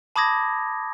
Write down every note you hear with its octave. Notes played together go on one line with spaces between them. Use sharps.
A5 B5 D6 D#6 G#6 A#6